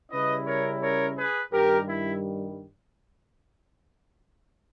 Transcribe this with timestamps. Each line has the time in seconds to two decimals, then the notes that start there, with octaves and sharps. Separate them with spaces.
0.11 C#3 G3 C#4 E4 B4 D#5
0.46 A#4 C#5
0.81 A#4 C#5
1.17 G#4 B4
1.53 G2 D#3 G3 G4 A#4
1.88 E4